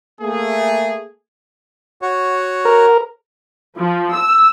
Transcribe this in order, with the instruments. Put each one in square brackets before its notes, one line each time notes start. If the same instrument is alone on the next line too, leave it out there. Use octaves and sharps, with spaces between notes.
[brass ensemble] A3 A#3 G#4
[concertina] F#4 C#5
[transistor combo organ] A#4
[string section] F3
E6